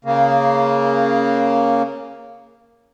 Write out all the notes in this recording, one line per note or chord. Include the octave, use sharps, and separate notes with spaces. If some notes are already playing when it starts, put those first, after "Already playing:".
C#3 A#3